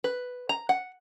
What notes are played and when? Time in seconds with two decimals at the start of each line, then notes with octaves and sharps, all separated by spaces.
0.04 B4
0.49 A#5
0.69 F#5